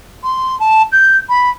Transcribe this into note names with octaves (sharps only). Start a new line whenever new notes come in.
C6
A5
G6
B5